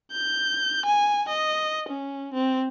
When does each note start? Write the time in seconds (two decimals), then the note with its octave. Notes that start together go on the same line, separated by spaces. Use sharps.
0.12 G6
0.86 G#5
1.29 D#5
1.89 C#4
2.34 C4